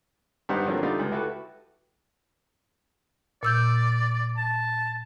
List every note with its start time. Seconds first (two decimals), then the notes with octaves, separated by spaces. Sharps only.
0.49 G2 G3 D#4 C5 F#5
0.66 D3 F3 F#3 A#3 C4
0.83 D3 G3 A3 D#4 F4 D5
0.99 C#2
1.12 E4 F#4 G4 A4 B4
3.43 A#2 D5 E6 G6
4.37 A5